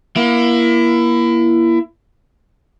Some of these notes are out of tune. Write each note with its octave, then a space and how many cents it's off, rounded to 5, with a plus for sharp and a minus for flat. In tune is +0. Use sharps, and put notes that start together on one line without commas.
A#3 +30 E4 +25